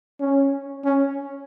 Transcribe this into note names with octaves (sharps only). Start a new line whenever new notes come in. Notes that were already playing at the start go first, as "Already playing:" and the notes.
C#4
C#4